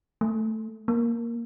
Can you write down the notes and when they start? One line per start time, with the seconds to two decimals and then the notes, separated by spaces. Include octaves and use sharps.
0.21 A3
0.88 A#3